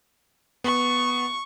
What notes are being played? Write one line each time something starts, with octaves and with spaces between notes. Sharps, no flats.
B3 C#6